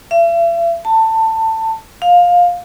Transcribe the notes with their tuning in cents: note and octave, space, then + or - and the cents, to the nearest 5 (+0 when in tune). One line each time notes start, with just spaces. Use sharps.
E5 +45
A5 +20
F5 +15